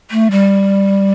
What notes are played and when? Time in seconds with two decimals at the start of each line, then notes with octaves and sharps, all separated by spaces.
0.11 A3
0.31 G3